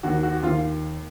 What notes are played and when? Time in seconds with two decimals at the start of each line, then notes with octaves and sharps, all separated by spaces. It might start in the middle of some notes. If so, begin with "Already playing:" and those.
0.03 D#2 F#4
0.23 F#4
0.43 D#2 F4